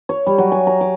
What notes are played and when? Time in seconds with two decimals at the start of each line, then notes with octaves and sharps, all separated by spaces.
0.09 C#5
0.27 G3
0.38 F#3
0.52 G#5
0.67 A#5
0.81 D6